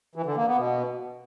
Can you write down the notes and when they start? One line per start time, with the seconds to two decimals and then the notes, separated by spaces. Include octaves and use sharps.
0.15 E3
0.26 D3
0.37 A#3
0.47 B3
0.58 B2